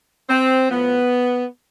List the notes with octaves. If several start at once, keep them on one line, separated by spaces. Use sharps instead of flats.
C4
A2 F3 B3